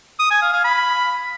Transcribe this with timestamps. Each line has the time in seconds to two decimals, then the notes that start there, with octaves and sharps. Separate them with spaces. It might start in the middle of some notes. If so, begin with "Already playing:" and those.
0.19 D#6
0.30 G#5
0.42 F5
0.53 F5
0.64 B5